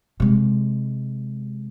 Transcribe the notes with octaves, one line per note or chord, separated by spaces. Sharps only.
C3 G#3